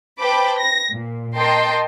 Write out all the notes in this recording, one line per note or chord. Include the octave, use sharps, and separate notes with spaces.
B4 C5 G5 A5 B5 D6
A#6
A#2
A#4 D#5 G5 A5 C6